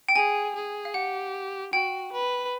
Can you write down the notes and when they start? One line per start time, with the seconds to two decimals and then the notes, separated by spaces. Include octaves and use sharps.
0.09 G5
0.16 G#4 G#5
0.55 G#4
0.85 F5
0.94 G4 F#5
1.73 F#4 G5
2.12 B4